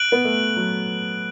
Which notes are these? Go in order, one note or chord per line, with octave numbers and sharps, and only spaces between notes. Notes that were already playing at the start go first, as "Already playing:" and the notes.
Already playing: F#6 D7 F#7
B3
A3
F#3